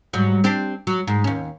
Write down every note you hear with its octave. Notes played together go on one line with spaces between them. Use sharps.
G#2 F#3 G3
C4 D4 G4
F#3
G#2
D#2 C#4